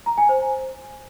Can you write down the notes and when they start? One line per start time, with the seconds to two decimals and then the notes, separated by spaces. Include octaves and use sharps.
0.06 A#5
0.18 G#5
0.29 C5